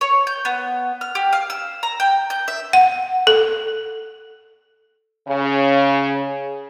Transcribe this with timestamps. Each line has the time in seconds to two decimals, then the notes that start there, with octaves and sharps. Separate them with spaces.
0.01 C#5
0.27 G6
0.45 B3
1.01 F6
1.15 G4
1.33 F5
1.50 E6
1.83 A#5
2.00 G5
2.30 G6
2.48 E5
2.73 F#5
3.27 A4
5.28 C#3